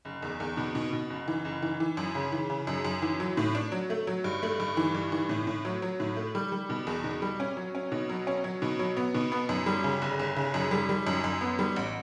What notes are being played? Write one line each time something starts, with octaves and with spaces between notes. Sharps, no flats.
F#1
E2
E2
B2
B2
B2
F#1
E3
F#1
E3
E3
F#2
C#3
E3
C#3
F#2
F#2
E3
F#3
A2
D4
F#3
A3
F#3
G2
A3
G2
E3
G2
E3
A2
A2
F#3
F#3
A2
A3
G3
G3
B2
E2
B2
G3
C#4
F#3
C#4
B2
F#3
C#4
F#3
B2
F#3
B3
B2
B3
F#2
G3
C#3
G1
G1
C#3
F#2
G3
G3
F#2
F#2
B3
G3
A1